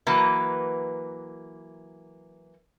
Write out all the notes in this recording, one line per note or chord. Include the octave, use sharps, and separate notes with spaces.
E3 F#3 A#3 B4